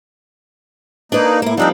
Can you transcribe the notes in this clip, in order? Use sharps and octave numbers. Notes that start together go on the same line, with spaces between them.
A#3 D4 D#4 B4 D5
A2 A#3 E4
F3 G3 A#3 C4 D4 D#4